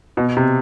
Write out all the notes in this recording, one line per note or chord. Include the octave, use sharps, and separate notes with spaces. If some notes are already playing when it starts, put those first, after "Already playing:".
B2
C3